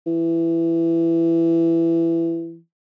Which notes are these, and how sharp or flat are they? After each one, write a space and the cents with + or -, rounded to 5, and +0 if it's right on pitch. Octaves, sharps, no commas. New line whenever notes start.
E3 +15